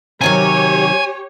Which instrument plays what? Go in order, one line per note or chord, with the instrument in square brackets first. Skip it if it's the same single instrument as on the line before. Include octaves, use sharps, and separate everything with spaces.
[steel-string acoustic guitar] C3 D#3 F#3 [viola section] G4 C#5 [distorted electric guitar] G#5